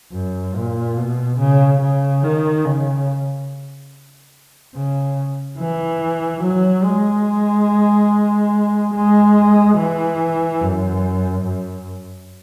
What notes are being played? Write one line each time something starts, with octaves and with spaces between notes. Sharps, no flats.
F#2
A#2
B2
C#3
C#3
D#3
C#3
C#3
E3
F#3
G#3
G#3
E3
F#2
F#2